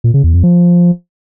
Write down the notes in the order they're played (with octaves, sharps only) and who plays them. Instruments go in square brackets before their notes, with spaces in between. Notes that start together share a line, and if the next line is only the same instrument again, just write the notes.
[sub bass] A#2
C#3
E2
F2
F3